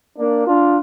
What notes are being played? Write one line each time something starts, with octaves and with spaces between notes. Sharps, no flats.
A#3 D4
D4 F4